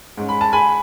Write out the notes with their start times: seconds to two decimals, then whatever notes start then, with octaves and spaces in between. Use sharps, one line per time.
0.17 G#2 G#3 C#4
0.29 B5
0.41 A5
0.53 G#5 B5